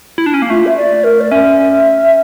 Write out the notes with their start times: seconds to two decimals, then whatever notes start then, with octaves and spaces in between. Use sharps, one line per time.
0.18 E4
0.26 D4
0.34 C#4
0.42 A#3
0.50 A3 F4
0.66 E5
0.77 D5
1.04 A#4
1.21 D5
1.31 C#4 E5